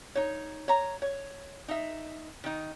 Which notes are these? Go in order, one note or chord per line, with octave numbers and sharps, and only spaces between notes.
D#4 C#5
C#5 A#5
C#5
D#4 E5
D#3 D#4